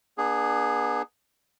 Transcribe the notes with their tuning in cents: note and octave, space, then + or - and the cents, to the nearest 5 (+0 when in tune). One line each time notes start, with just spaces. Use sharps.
B3 -35 D4 +30 G#4 +0